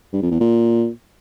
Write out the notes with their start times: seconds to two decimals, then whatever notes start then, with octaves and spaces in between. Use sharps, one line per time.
0.13 G2
0.22 F2
0.31 E2
0.40 A#2